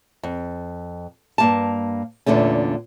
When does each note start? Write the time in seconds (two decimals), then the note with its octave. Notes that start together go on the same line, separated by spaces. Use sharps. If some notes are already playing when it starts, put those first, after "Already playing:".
0.23 F2
1.38 G2 A#3 A5
2.26 E2 A#2 D3 A3 C#4